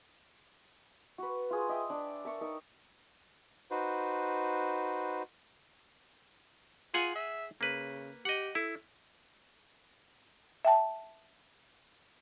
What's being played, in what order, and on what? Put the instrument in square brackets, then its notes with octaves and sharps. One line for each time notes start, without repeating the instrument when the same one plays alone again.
[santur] F#4 B4
F4 G#4
D#5 E5 G5 C6
D4 D5
A#4 E5 A5 C#6
D#4 A#4
[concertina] D#4 F#4 B4 C5
[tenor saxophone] F4 [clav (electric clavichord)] G#4 F#5 G#5
[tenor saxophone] E5
[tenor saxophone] C#3 [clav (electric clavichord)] A#3 B4
[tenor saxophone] G4 [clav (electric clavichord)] D#5 F#5
[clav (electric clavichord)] E4 [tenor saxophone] A4
[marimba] E5 G5 A5